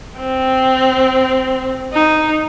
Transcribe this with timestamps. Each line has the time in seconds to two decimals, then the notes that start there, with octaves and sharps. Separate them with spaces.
0.18 C4
1.93 D#4